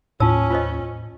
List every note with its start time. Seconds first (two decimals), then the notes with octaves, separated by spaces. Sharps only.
0.20 D#2 A2 C#4 F4 A5 E6
0.50 F4 C5 D#5